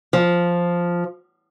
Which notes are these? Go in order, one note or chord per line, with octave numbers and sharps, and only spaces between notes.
F3